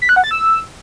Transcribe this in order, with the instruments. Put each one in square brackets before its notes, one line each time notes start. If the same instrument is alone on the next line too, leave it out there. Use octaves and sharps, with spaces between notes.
[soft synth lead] B6
F#6
F#5
A6
E6